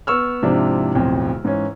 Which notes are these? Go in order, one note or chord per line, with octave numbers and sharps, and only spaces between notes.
B3 C#6 E6 F6
G#2 C3 F3 C4 D4 E4
D1 B1 F2 C5
G#2 E3 C#4